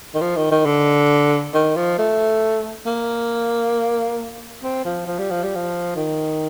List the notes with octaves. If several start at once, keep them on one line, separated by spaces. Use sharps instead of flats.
D#3
F3
D#3
D#3
D3
D#3
F3
A3
A#3
C4
F3
F3
G3
F3
G3
F3
D#3